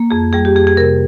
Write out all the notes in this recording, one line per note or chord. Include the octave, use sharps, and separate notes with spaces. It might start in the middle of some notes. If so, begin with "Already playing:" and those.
Already playing: A#3
F2 G#4
G3 G#4
G4
F2 G#4
G#4
C3 A#4